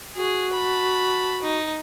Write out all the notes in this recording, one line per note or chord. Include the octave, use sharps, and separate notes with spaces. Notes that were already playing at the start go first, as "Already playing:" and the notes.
F#4 G#4
A5 B5
D#4